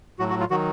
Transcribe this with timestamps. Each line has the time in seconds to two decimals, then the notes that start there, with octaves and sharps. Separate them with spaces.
0.19 A2 F#3 F#4
0.30 F#4
0.40 F4
0.51 D#3 F#3 F#4